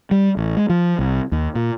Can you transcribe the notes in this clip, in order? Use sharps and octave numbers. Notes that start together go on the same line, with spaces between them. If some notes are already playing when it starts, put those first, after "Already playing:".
G3
A1
G#3
F3
C2
D#2
A#2